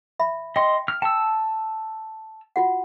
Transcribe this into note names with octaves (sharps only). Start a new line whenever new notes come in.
E5 B5
D#5 G5 C6
F6
G5 A5 E6
F4 F#4 F#5